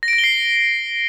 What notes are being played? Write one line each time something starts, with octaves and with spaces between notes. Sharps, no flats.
A#6
D7
A#6
G7
C7